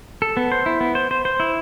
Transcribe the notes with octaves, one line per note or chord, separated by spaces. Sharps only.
A4
B3
C5
E4
B3
C5
C5
C5
E4